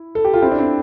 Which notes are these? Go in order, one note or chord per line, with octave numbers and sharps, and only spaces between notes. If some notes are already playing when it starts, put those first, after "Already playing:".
Already playing: E4
A4
G4
F4
C4 E4
D4
C4